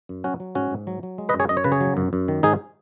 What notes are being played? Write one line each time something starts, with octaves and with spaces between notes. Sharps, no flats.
F#2
F#3 C#4 F#4
F#3
G#2 C#4 F#4
G#2
F#3
F#3
G#3
B4 D#5
F#2
G#4 C#5
F#2 D#5
C#5
C#3 B4
G#4 C#5
F#3
F#2
F#2
D#3
G#2 D#4 G#4